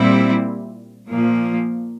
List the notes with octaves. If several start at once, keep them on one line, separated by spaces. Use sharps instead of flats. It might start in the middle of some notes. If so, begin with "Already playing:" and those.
Already playing: A#2 G3 C4 E4
A#2 F3 A#3